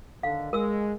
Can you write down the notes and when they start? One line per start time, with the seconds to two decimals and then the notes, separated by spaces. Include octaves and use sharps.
0.23 D3 D#3 A4 F5
0.53 G#3 A#4 E6